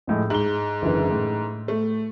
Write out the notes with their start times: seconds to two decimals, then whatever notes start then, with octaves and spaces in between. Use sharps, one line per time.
0.07 F2 A2 G#3
0.30 G#2 F#7 G7
0.82 F#1 D3 E3
1.11 A2
1.68 A3